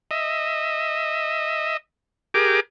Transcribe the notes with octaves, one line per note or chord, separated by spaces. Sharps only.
D#5 E5
G4 G#4 A#4 D6